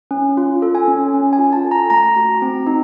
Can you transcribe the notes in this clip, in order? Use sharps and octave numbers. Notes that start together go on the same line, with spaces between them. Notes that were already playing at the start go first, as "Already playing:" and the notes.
C#4
F4
A4
G#5
C#4
C#4
G#5
F4
A5
A4
A#5
A3 A#5
F#4
C4
D#4